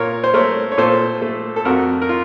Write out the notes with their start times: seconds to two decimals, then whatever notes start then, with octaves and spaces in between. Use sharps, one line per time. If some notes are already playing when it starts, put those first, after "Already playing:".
Already playing: A#2 A#4 C#5
0.24 C5
0.34 A3 A#4 C#5
0.72 C#5
0.78 A#2 A4 C5
1.22 A3
1.56 A4
1.65 F2 F#4 A#4
2.02 A#4
2.09 F4